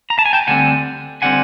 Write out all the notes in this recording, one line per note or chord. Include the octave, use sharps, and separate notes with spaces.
A#5
A5
G#5
G5 A5
D2 D3 G3 C4 F#5 G#5
D3 G3 C4 F#5 G#5